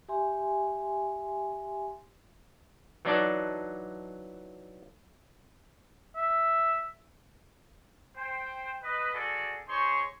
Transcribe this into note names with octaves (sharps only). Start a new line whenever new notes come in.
G4 E5 G#5 C6
E3 F#3 D4 D#4 D5 A5
E5
C5 G5
B4 D#5
F#4 G#4 A4 D5
D#4 G#4 C5 C#5 C6 C#6